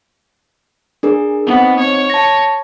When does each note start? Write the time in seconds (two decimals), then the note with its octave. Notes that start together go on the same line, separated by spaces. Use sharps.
1.03 D4 G#4 A#4
1.47 B3 C4 D#4
1.80 C#5
2.10 A5 A#6